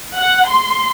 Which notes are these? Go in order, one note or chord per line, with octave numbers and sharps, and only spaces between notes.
F#5
C6